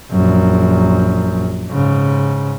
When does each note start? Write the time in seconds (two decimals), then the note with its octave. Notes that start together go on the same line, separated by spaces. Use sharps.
0.11 A#1 F#2
1.70 G#2 C#3